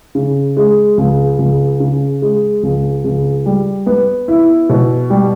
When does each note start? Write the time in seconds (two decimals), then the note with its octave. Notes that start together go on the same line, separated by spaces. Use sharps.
0.15 C#3
0.57 G#3
0.97 C#2
1.39 C#2
1.80 C#3
2.22 G#3
2.63 C#2
3.04 C#2
3.46 G3
3.87 B3
4.28 E4
4.70 B2
5.10 G3